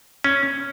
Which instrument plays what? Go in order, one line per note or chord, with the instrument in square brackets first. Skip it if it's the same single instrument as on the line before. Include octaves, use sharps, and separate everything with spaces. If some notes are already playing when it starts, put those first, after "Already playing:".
[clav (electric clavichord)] C#4